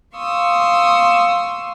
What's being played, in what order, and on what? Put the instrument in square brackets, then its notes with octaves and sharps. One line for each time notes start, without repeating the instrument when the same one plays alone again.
[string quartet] F5 C6 C#6 D#6 E6